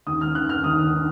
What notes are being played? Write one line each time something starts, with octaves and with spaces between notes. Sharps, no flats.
D#2 D#6
F6
D#3 F#6
F6
D#2 D#6
D#3